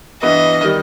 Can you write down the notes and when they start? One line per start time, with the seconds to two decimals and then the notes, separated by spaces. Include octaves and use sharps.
0.23 G2 E3 B3 D#5
0.62 D#3 G3